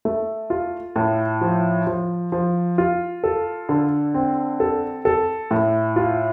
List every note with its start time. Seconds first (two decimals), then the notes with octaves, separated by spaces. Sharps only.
0.05 A3
0.50 F4
0.96 A2
1.41 F3
1.87 F3
2.32 F3
2.78 F4
3.24 A4
3.69 D3
4.14 C4
4.60 A4
5.05 A4
5.51 A2
5.96 F4